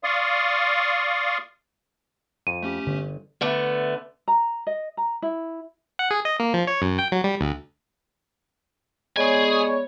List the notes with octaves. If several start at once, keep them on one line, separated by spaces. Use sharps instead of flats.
D5 F5 C6 C#6 D#6
F2 D#7
A3 C#4 G4
G1 D3
D3 A3 B3
A#5
D#5
A#5
E4
F#5
G#4
D#5
A#3
F3
C#5
F#2
G5
F#3
G3
D2
G#3 B3 G#4 C#5 D5 G#5